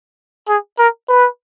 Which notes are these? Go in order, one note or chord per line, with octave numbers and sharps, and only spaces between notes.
G#4
A#4
B4